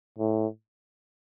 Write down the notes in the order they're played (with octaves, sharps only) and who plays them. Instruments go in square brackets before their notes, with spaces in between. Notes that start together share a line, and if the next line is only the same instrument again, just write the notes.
[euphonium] A2